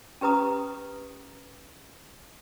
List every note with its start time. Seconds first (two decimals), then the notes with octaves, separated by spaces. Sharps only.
0.21 C#4 G4 B4 A#5 D#6